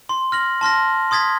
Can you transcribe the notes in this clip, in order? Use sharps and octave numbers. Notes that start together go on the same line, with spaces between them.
C6
F6 A#6 F#7
A5 C6 F6 A#6
C6 D#6 G#6 A6 B6